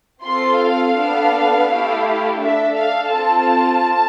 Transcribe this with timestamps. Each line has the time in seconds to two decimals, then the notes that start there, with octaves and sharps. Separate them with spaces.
0.22 C4 F4 A4 C6
0.59 F5
0.95 B3 D4 A4
1.68 A3 E4 G4
2.40 D4 A4 E5
2.77 F5
3.14 C4 F4 A4 A5